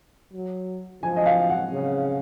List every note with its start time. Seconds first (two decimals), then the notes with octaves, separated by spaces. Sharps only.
0.34 F#3
1.03 F3 G#5
1.16 D#5
1.26 F5
1.49 F#5
1.72 C#3